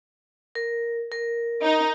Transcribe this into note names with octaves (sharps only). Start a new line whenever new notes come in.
A#4
A#4
D#4